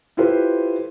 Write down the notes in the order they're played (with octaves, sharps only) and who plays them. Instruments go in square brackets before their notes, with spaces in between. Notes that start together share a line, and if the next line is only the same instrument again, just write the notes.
[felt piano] E4 F4 G4 A4 B4 C5